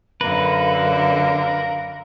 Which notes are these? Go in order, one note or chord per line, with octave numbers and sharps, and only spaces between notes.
F#2 D3 A#4 B4 F5